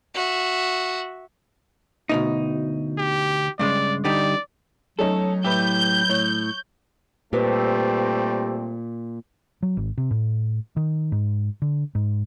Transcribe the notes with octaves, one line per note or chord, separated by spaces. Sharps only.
F#4 E5
D2 B2 D#4
G4
G2 C#3 G#3 D5
D3 G3 D#4 D5
F#3 A3 C#4 D#4 A4
A2 E4 G4 B4 G6
A2 C#5
A#2 G3 A3 C4 G4 B4 C5
F#3
G#1
C3
A2
D#3
G#2
D3
G#2